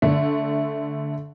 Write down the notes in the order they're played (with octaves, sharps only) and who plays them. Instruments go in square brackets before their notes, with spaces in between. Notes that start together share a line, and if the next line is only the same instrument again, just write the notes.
[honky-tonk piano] D3 A3